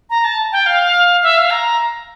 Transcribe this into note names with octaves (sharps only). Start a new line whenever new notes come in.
A#5
A5
G5
F5
E5
F5
A#5